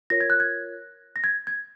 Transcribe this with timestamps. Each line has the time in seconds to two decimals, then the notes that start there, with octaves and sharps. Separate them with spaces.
0.10 F4 A#4 C#5 A#6
0.20 G#6
0.30 F#6
0.40 G#6
1.16 A#6
1.24 G#6
1.47 G#6